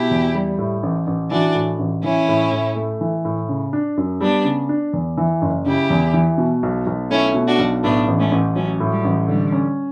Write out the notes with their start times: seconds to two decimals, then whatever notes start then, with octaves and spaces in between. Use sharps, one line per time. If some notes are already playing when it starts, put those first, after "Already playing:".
Already playing: B2 E4 G4
0.11 E2
0.35 G3
0.58 A2
0.83 A1
1.07 A1
1.31 E3 D4 F#4
1.55 A2
1.79 A1
2.04 E3 C#4 E4
2.28 A2
2.52 A2
2.76 A3
3.01 E3
3.25 A2
3.49 C#3
3.73 D4
3.97 F#2
4.21 G3 B3 D4
4.45 C#3
4.69 D4
4.93 E2
5.18 E3
5.42 F#1
5.66 C#3 E4 G4
5.90 E2
6.14 E3
6.38 B2
6.63 B1
6.87 B1
7.10 A3 C#4 E4
7.34 B2
7.47 D4 F#4
7.59 B1
7.83 A2 B3 D4
8.08 A1
8.19 A3 C#4
8.31 A1
8.55 F#3 A3 C#4
8.80 A2
8.92 G3
9.04 A1
9.28 D3 G3
9.52 C#4